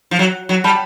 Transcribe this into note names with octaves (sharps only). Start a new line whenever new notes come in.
F3
F#3
F#3
G3 A5 B5